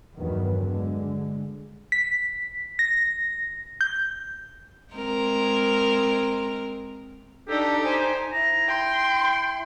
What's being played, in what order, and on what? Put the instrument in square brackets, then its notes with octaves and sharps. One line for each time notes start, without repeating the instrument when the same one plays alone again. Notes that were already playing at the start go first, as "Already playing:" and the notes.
[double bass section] E2 G2 D#3 F#3 B3
D3 G#3
[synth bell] B6
A#6
G6
[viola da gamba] G#3 C4 A#4
[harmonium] D4 A4 [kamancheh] D#4 [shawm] G4
[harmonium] C5 G#5
[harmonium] E4 [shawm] A#5
[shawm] G5 [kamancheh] C6